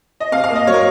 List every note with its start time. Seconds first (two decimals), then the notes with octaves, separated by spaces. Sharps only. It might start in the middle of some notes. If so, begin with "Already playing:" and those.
0.20 D#5
0.32 C3 F5
0.44 F5
0.50 A#3
0.56 D#5
0.67 F#3 C#5
0.74 A#4